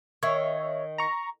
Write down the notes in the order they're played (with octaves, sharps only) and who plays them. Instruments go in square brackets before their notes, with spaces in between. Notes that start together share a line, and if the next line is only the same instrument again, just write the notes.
[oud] D#3 [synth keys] C#5 E5
[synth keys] A#5 C#6